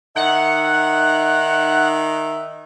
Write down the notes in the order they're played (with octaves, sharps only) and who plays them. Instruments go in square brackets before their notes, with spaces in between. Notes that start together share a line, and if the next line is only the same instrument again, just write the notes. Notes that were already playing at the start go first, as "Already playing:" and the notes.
[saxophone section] D#3 D#4 E5 [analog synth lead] F#5